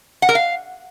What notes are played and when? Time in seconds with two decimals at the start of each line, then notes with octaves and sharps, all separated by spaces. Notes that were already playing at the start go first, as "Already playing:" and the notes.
0.22 F#5
0.29 A#4
0.35 F5